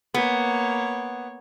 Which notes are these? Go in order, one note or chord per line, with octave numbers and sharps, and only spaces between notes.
A#3 B3 C#5